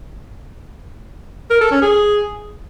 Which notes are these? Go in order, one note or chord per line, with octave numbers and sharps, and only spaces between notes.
A#4
A4
C#4
G#4